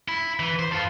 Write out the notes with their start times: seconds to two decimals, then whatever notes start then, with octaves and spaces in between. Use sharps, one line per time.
0.08 E4
0.40 E3
0.59 C5
0.72 F4 A4